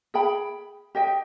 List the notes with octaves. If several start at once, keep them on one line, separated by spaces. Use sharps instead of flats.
G#4 G5 B5
G4 D#5 G5